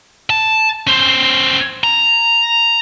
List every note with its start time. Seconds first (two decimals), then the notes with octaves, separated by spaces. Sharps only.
0.30 A5
0.87 C#4 C5
1.84 A#5